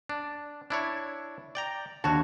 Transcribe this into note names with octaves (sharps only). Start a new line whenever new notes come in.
D4
D4 E4 C#5
D5 G5 A#5
D#2 D3 F#4 C#5 A5